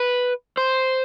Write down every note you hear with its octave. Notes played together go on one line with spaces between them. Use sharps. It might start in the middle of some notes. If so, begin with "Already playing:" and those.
Already playing: B4
C5